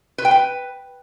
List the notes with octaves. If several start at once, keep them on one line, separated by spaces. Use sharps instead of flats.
B4
G5
B4